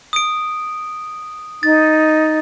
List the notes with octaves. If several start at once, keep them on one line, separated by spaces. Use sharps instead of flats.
D#6 D7
D#4 A6